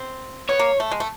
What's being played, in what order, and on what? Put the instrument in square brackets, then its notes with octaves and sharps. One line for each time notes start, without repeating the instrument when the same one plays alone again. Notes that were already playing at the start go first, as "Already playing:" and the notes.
Already playing: [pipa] C4
[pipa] B3 [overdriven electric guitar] C#5
[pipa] A#3
A3
G#3
A3